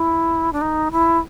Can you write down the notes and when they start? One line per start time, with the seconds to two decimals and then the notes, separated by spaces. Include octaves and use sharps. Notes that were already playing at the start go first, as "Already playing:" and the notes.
Already playing: E4
0.53 D4
0.61 D#4
0.92 E4